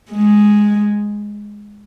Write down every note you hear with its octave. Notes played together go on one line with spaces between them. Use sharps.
G#3